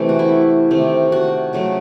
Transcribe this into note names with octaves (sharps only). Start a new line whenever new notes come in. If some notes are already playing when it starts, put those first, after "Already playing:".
Already playing: C3 E3 A3
F#4
E4
C3 D#3 A3
F#4
C#3 F#3 A3